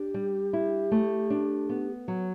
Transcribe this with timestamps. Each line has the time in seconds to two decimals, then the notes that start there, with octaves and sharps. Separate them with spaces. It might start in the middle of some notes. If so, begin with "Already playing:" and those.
Already playing: D4 G4
0.14 G3
0.53 E4
0.91 A3
1.30 D4
1.69 B3
2.08 F#3